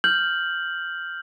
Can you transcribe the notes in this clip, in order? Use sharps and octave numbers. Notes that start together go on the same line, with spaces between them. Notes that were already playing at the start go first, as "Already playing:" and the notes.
F6 G6 F#7